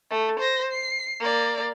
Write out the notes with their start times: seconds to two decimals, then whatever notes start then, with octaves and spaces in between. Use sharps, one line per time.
0.10 A3
0.39 C5 A#6
0.72 C7
1.20 A#3 D5